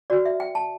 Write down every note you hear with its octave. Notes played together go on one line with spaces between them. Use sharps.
F#4 B4 D5
E5
G5
A5